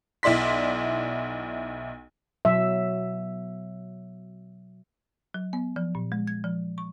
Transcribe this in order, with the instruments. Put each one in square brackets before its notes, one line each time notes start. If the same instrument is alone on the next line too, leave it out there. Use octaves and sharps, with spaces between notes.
[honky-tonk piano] B1 E4 D5 C6 B6
[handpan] B2 F#3 E5
[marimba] F#3
B3
F3
A#2
G#3
G#6
F3
C#6